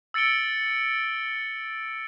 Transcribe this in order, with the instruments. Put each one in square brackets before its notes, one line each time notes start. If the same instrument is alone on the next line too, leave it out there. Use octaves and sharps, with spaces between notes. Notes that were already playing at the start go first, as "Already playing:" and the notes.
[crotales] E6 A6 C#7 D7 G7